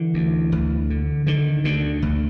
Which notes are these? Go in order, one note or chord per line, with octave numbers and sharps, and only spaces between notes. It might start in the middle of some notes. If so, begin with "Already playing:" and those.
Already playing: D3 E3
D2
D2
D3
D3 D#3
D2 D3
D2